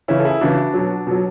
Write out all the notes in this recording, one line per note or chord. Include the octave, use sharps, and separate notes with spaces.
C#3 E3 C#4 E4
A4
E4 G#4
C#3 E3 D4 F#4
B2 F#3
B2 F#3